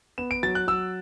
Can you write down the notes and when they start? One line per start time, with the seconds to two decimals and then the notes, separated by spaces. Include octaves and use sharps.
0.18 B3 E7
0.31 D7
0.43 F#3 A6
0.55 F#6
0.67 F#3 E6